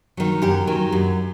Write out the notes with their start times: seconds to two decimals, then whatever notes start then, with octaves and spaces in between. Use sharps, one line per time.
0.17 D#3 F#3
0.42 F#2 G4
0.67 D#3 F#3
0.92 F#2